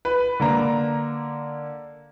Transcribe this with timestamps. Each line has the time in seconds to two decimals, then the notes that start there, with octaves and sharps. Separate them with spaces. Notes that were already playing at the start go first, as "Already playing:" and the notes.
0.05 B4
0.40 D3 A#3 A#5